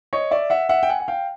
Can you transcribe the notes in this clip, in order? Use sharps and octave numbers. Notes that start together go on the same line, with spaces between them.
C#5 D#5
D5 E5
E5 F#5
E5 F#5
G5
F#5 G#5
F#5
F5 G5